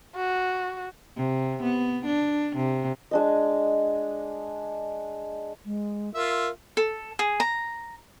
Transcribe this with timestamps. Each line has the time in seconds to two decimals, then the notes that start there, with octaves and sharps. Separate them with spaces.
0.16 F#4
1.17 C3
1.63 B3
2.05 D4
2.55 C3
3.11 G#3 D4 D#5
5.65 G#3
6.15 F4 A#4 E5
6.77 A4
7.19 G#4
7.40 A#5